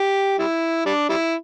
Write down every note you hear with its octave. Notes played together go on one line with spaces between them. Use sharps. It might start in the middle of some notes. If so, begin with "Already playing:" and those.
Already playing: G4
G3 E4
G3 D4
G3 E4